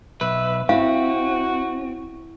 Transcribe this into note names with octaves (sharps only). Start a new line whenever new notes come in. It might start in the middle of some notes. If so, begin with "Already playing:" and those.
B1 B4 E5
C4 E4 F#4 F5